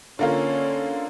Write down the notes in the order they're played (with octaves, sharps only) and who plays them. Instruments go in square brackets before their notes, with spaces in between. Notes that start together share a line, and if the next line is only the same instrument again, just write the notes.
[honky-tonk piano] D3 A#3 F4 [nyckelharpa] C#4